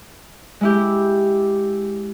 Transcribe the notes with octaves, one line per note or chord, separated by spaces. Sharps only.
G#3 E4 G4